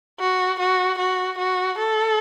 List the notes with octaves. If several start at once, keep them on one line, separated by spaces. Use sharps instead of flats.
F#4
F#4
F#4
F#4
A4